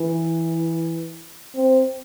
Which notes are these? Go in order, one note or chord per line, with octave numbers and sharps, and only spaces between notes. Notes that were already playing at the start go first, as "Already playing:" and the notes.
Already playing: E3
C4